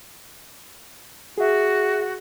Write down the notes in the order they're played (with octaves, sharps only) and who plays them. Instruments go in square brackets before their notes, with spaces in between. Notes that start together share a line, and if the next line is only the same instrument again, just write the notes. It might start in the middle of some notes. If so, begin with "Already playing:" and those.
[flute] F#4 [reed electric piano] G#4 E5